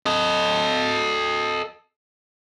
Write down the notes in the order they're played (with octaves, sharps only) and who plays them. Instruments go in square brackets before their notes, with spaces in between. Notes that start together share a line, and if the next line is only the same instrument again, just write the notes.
[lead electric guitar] A4 D#5